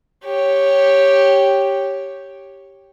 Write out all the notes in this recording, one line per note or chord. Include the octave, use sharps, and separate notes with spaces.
G4 C#5